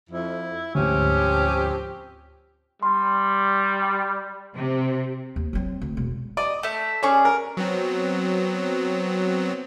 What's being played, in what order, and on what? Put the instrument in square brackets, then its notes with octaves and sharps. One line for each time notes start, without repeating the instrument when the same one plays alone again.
[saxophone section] F2 [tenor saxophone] E4
[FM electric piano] D2 G#2 [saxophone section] F3 C4 G4 [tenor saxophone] C#4
[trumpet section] G3 [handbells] C6
[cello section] C3
[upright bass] D#2
F#3 C4
D2
E1
[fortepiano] D5 [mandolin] D#5
[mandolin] A3 E5
[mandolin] C#4 G#4 D5 [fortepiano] C#5 C#6
[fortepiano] A#4
[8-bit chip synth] F#3 B3 C4